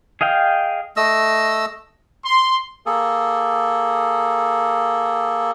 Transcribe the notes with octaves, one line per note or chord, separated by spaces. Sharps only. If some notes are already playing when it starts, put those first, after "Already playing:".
G#4 D#5 F5 G5
A3 D#5 E6
C6
A#3 G#4 A4